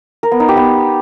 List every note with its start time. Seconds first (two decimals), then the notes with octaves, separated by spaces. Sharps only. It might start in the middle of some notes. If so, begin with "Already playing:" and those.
0.23 A#4
0.32 B3
0.40 D#4
0.49 G4
0.57 B3